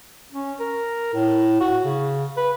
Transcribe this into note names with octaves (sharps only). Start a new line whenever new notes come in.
C#4
A#4
A2
F#4
C#3
B4